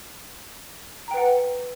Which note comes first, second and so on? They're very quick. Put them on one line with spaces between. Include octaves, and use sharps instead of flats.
A#5 G5 B4 F#5